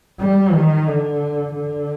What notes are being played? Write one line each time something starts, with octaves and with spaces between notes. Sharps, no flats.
G3
D#3
D3
D3